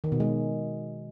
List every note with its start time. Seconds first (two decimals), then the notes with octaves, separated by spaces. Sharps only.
0.04 D#3
0.12 B2
0.20 G#3